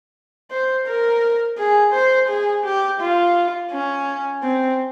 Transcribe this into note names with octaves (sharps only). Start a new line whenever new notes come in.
C5
A#4
G#4
C5
G#4
G4
F4
C#4
C4